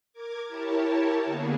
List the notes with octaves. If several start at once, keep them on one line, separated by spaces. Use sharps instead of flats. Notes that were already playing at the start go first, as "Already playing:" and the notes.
A#4 D6 G#6
E4 G4 A#4 C#5 A5
D3 A#3 B3 G#4